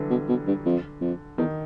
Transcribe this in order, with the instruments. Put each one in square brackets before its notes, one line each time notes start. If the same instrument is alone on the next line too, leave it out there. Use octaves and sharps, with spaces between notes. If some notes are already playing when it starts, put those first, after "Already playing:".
Already playing: [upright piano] D3 E3 F#3 G3
[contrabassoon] B2
B2
G2
F2
F2
[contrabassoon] E2 [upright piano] D#3